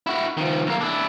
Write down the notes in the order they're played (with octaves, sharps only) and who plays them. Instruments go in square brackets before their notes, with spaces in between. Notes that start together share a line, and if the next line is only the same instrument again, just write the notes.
[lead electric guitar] E4 F#4
D#3 F3
B1 A#3
D4 E4